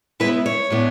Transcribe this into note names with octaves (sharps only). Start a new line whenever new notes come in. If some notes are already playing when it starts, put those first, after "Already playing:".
C#3 G#3 B3 E4 B4
C#5
A2 G#3 B3 D4